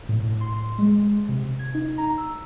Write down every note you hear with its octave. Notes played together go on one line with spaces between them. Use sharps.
A2
C6
G#3
C3
G#6
D#4
A#5
E6